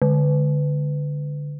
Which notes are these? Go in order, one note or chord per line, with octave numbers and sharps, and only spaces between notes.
D3